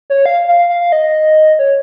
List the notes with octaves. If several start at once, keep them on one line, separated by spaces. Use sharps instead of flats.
C#5
F5
F5
F5
F5
F5
D#5
C#5